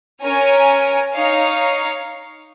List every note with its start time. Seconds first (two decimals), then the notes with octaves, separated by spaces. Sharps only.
0.23 C#4 A#4 C#5 G#5
1.14 D#4 C#5 F5